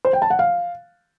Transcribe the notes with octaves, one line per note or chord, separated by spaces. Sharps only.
C5
G5
A5
F#5
F5